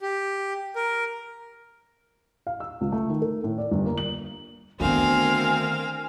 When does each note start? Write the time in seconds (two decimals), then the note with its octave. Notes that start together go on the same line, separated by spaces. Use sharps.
0.01 G4
0.76 A#4
2.47 F5
2.60 E6
2.81 C#2
2.92 A3
3.09 D#3
3.22 A#4
3.44 A2
3.58 D5
3.71 G1
3.85 A#3
3.98 F#7
4.80 D2 D#3 B3 C4 A#4 F5 G#5